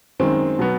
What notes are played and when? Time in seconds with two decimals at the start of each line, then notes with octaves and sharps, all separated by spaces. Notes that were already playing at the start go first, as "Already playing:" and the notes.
0.19 F#2 D#3 G#3 C4
0.59 B2 F#3 B3